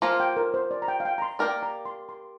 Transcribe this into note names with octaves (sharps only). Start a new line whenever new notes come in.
F3 A#3 F4
G5
A#4
C5
D5
A#5
G5
F5
G5
A#5
C6
A#3 G4 A#4 D5 G5
A#5
C6
C6